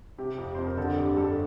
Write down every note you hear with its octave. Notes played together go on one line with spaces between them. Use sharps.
C3 G4
F2
F2 C5
A#4
D3 A4
G2 G4
G2 A4